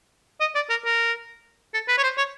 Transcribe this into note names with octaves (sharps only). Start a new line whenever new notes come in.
D#5
D5
A#4
A#4
A4
B4
C#5
C5
C#5